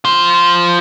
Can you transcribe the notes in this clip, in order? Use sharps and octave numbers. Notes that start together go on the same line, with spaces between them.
F4 C5